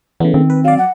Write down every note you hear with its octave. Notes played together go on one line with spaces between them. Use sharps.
C#3 E3 A3 B3
D#3 C4
B4
F#3 D5 F5
F#5